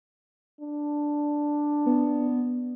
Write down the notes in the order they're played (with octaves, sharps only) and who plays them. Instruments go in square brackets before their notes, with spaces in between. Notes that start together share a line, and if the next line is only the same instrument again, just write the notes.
[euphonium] D4
[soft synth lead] B3